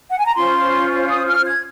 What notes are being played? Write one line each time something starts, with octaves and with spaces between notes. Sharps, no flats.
F#5
G#5
A#5
C#4 F4 C5 C6
D#6
F6
G#6